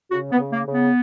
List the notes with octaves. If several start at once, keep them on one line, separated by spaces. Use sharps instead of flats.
C#3 F#4
B3
C#3
A#3
C#3
B3